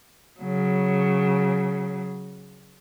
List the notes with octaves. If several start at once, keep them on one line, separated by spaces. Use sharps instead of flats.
C#3 F#3